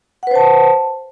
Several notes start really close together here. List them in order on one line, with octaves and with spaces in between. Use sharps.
F#5 B4 C5 A5